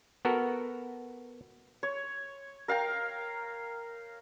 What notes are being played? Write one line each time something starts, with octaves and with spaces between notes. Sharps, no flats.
B3 F#4 A4 A#4
C#5
A#4 F5 G5 A#5